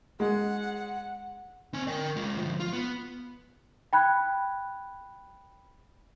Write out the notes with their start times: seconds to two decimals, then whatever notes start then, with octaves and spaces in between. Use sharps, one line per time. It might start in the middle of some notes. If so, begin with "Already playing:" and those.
0.20 G#3 F#5
1.74 C4 G#5
1.88 A#4 G5
2.16 G#3 F4
2.37 D2 F3
2.60 F4
2.73 B3
3.93 G5 B5 F#6 G#6